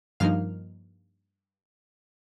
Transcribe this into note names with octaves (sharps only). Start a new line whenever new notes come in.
G2 F3 A#3 D#4 F5 F6